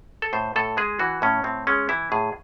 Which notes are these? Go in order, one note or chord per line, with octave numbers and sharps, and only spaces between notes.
A4
A2 C5
A2 A4
G#3 G#4
E3 F#4
A2 C#4
A2 C4
G#3 C#4
E3 E4
A2 G#4